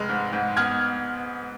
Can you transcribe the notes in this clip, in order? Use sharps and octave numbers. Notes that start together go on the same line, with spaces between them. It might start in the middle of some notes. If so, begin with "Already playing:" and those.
Already playing: F1 G#3 F6
G#2
G#2
B3 F6 G#6